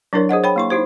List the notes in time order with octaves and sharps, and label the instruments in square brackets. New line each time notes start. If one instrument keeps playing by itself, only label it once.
[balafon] F#3 D4 E4 A#4 C#5
G#4 C5 D#5 F#5
C#5 G5 B5
A#3 E4 C#6
D#4 E4 G4 C5